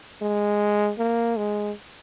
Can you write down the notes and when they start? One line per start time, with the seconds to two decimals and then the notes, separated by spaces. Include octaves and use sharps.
0.22 G#3
0.99 A#3
1.37 G#3